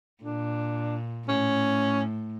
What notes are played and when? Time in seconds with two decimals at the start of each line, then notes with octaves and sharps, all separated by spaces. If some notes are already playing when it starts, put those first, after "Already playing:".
0.23 A#2 D4
1.27 A2 C#4